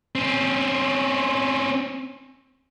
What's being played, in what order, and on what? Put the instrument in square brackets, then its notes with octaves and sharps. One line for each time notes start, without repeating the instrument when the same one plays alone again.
[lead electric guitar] C4 C#4